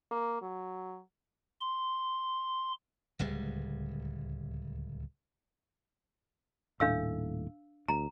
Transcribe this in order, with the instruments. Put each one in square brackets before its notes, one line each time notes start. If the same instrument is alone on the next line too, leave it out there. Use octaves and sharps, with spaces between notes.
[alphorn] A#3
F#3
[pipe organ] C6
[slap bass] D1 C#2 G3 G#3
[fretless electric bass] D#1 A2 A3 [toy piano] D4 F5 E6
[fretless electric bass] D2 [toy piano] A#5